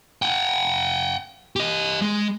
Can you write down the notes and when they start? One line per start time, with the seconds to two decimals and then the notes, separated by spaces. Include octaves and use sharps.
0.22 F#5 G5
1.56 G4 D#5
2.02 G#3